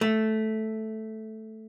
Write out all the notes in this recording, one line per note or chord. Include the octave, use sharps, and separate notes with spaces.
A3